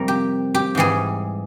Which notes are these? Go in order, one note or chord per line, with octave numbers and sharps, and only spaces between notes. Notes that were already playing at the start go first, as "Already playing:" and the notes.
Already playing: F2 C3 G3 A#4 C5
G4
G4
G#2 E3 G3 G#4